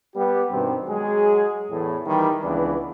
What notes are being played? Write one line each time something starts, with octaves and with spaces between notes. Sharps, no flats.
G3 B3 G4
G2 B2 D#3 C4
F#3 G#3 G#4
E2 A2
D#3 E3 G3
C#2 E3 B3 D4